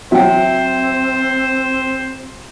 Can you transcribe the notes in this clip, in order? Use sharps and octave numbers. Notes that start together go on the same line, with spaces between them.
F#3 C4 C5 E5 G5